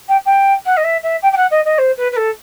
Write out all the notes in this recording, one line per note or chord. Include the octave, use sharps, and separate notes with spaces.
G5
G5
F#5
D#5
E5
E5
G5
G5
F#5
D#5
D#5
C5
B4
B4
A4